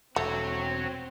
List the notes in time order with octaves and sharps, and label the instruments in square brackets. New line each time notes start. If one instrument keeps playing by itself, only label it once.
[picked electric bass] E1 [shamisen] A3 [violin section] C4 [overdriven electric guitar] F#4 C#5